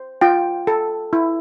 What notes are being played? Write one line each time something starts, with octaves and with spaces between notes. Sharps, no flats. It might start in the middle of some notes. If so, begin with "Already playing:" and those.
Already playing: C5
F4 G5
A4
E4